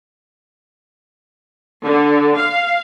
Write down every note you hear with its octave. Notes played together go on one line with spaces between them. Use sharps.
D3
F5